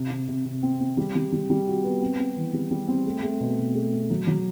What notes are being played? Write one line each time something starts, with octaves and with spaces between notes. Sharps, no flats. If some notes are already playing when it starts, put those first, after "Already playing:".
Already playing: C3
C3
C3
C3
C4
C4
G3
G3
G3
G3
F#4
B3
C4
C4
E3
G3
G3
C4
A3
A3
B2
B2
A3
C4
F#3
F#3